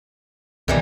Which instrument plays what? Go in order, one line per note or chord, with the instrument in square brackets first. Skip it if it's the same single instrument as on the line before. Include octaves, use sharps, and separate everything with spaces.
[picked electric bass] C2 B2 [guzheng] D#3 E3 G3